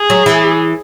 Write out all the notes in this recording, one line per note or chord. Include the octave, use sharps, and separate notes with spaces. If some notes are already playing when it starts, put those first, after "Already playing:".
Already playing: G#4
F#3
E3